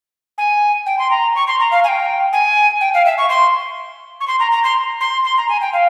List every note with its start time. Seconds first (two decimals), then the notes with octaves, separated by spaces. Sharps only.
0.37 G#5
0.86 G5
0.98 C6
1.10 A#5
1.35 C#6
1.47 C6
1.59 A#5
1.71 F5
1.84 G#5
1.88 G5
2.32 G#5
2.80 G5
2.94 F5
3.05 E5
3.17 C#6
3.29 C6
4.20 C#6
4.27 C6
4.39 A#5
4.51 A#5
4.63 C6
5.00 C6
5.24 C6
5.37 A#5
5.48 G#5
5.61 G5
5.73 F5